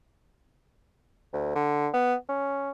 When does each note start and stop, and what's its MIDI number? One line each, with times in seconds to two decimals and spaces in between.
1.34 1.54 38
1.56 1.89 50
1.93 2.15 59
2.29 2.71 61